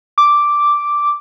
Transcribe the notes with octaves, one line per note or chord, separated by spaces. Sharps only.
D6